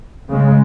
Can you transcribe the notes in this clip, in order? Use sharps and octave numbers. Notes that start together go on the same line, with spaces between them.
C#3 G#3